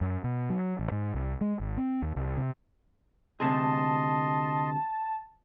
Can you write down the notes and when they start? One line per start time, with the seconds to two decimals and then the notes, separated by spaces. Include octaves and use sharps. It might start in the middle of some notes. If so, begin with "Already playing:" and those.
0.01 F#2
0.24 B2
0.50 F#3
0.79 A1
0.91 G#2
1.14 C2
1.41 G#3
1.60 G#1
1.77 C4
2.02 D#2
2.16 C2
2.37 C3
3.40 D2 C3 G#4 D#5 A5 C6